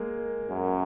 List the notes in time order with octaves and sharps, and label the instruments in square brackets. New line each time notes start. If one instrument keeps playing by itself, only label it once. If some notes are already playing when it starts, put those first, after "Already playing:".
Already playing: [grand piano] G#3 A#3
[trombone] F#2